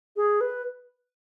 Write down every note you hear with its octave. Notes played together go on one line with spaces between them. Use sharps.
G#4
B4